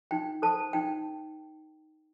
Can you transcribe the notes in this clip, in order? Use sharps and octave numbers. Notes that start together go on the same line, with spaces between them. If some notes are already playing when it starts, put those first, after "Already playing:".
D#4 G5
A4 C5 A5
D#4 G5